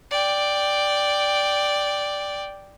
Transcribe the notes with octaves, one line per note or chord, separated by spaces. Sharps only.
D5 G5